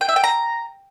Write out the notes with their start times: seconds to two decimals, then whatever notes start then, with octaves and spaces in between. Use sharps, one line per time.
0.01 G5
0.09 E5
0.16 G5
0.24 A#5